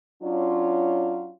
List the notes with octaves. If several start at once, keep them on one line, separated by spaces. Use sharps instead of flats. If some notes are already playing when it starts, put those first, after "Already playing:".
F#3 C#4 D4 F4